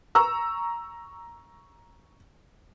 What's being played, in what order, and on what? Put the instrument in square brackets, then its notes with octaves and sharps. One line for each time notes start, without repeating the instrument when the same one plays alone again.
[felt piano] A#5 C#6 E6